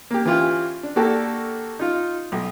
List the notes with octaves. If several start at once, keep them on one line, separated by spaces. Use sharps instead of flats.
A#3 G4
E3 C#4 F4 G4
D4
A#3 D4 F#4 G4 A4
D#4 F4
B1